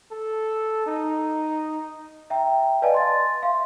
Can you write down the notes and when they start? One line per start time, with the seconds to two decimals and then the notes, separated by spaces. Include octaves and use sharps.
0.11 A4
0.86 D#4
2.30 E5 G5 A#5
2.82 B4 D5 D#5 F5 G#5 A5
2.94 C6 A6
3.42 E5 F5 C6